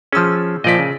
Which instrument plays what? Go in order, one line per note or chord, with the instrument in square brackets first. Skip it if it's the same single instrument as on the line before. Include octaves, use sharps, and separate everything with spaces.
[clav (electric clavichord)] F3 C#4 [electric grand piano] G#4 E6
[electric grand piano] A#2 F3 B6 [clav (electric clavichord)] D5 D#5
[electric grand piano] C#3